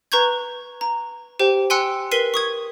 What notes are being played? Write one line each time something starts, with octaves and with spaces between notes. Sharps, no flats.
B4 A#5 C#6 G6 G#6
A#5
G4 C5 G5
G5 G#5 C6 E6 F#6 C#7
A#4 B4 B6 C7 D#7 G7
C#6 D#6 G#6